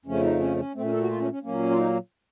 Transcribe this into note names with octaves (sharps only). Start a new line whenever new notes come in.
F2 C#3 F3 A3 C#4
D#4
C#4
C#4
A#2 A3 C4
C#4
A4
F#4
F4
C#4
C#4
A#2 F#3 A#3 C#4
F4
D#4